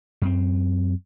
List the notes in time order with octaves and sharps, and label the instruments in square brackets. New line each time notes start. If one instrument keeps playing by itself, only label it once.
[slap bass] F#2 C4